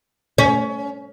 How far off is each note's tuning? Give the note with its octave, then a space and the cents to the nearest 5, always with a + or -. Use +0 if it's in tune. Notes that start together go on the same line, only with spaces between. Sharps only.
C#4 +25